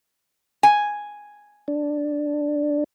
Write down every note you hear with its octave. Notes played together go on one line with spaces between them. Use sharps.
G#5
D4